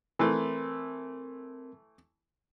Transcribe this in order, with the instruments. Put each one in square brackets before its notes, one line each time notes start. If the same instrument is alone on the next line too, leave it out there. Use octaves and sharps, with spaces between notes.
[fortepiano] E3 A3 [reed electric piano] C4 A#4 C6